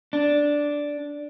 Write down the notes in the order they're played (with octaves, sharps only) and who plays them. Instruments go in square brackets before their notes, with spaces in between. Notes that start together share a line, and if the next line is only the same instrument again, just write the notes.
[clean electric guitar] D4